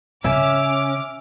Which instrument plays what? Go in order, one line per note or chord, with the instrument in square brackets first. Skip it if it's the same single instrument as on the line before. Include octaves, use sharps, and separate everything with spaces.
[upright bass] C#3 [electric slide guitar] C#4 [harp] E5 G#5 [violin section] D6 F6